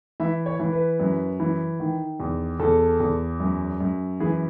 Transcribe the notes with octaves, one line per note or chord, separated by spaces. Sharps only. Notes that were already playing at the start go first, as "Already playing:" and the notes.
E3 E5
C#5
E3
B4
F#2
E3
D#3
E2
E2 A4
E2
F#2
F#2
E3 G#4